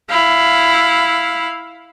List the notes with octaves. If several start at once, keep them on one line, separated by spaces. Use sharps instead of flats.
E4 F5